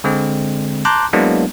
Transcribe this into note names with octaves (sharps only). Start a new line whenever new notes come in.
D3 G#3 C4
A5 A#5 C6 D6 F#6 G6
F#3 G#3 A#3 B3 D4 E4